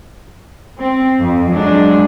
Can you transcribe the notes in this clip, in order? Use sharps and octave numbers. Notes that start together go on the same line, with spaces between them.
C4
F2
F#3 G#3 D4